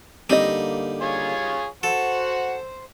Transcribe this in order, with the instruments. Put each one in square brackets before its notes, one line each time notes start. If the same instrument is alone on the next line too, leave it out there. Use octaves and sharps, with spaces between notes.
[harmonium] D3 A#3 [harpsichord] G3 D#4 [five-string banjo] C4 D#5
[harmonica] F4 G#4 C#5
[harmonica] F#4 F#5 [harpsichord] A4 [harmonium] C5